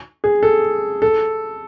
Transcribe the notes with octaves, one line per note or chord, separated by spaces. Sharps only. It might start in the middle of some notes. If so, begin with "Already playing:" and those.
G#4
A4
A4